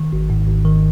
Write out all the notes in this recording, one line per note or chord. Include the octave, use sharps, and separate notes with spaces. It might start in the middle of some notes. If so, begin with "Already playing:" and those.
Already playing: D#3
G#1
G#2
G#1
D#3